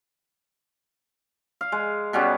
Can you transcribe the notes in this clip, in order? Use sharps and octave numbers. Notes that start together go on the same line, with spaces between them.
F5
G#3
B2 G3 B3 C#4